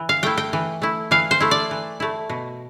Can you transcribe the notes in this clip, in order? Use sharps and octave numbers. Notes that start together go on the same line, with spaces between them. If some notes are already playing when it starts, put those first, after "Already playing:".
Already playing: E3
F5
A3 E4 G5
G5
E3
A3 E4
E3 F5
C5
A3 E4
D5
E3
A3 E4
B2